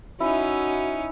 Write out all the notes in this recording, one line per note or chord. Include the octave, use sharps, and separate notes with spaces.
C#4 D#4 E4 F#4